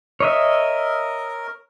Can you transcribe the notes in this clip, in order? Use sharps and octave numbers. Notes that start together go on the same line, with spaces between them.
A#4 C#5 D#5 E5